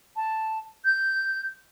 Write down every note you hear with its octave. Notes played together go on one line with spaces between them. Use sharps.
A5
G6